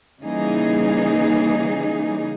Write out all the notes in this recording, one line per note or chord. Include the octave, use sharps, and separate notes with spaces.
C#3 E3 G3 A#3 D#4 G#4